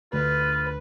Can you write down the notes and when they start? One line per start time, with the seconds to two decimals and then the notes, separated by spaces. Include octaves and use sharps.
0.13 D2 F4 B4